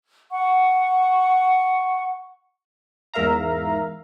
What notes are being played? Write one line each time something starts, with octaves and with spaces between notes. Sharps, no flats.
F#5 C#6
E2 G#2 A#4 E5 F5 A#5